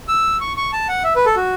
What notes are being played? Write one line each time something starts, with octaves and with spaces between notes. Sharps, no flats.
E6
C#6
C#6
A5
F#5
E5
B4
A4
F#4